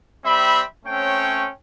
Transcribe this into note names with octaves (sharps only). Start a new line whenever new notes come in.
G3 C4 E5 B5
A3 C4 C#4 C#5 G5